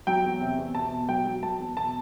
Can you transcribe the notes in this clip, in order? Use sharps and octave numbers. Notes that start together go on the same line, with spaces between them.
F#3 G5
E2
C3
E2
B2 A5
B2
F#3 G5
F#3
F#3 A5
E2
B2 A5